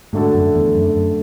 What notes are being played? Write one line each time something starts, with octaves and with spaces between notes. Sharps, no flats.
G#2 D3 A3 D4 F#4 A4
F#2
E2
F#2
F#2